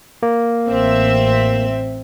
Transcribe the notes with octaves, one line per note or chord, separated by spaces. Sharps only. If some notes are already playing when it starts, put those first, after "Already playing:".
A#3
A1 C4 E5